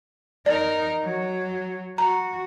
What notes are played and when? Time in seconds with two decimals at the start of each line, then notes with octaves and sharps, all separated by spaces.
0.46 D#4 A#4 D5
1.04 F#3
1.98 F#4 A#5